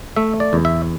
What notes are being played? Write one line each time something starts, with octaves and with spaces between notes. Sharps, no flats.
A3 E5
D5
E2
E5